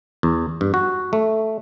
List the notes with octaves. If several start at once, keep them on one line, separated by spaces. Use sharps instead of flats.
E2
G2
F#4
A3